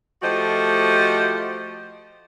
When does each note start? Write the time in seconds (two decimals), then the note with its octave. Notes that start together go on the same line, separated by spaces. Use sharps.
0.22 F3 A3 F#4 G4 C5 D#5